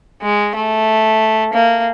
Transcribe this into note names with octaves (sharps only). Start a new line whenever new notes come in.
G#3
A3
A#3